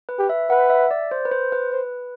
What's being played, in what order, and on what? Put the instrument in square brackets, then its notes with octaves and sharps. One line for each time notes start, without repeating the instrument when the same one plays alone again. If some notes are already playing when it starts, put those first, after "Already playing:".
[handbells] B4
[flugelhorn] G4
[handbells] E5
[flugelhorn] B4 [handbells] F#5
[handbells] E5
D5
C5
B4
C5
B4
[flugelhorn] C5